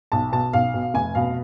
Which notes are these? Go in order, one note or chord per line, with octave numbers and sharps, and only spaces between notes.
B1 A5
B2 A5
B1 F5
B2
F1 G#5
B2 F5